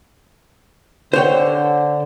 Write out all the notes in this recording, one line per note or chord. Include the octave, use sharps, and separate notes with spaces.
D3 C5 C#5 G5